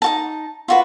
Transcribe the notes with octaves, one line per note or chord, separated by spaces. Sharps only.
D#4 F#4 A5
F4 F#4 B4